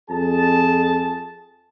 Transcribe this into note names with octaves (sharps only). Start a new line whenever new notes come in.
F2 G#4 A5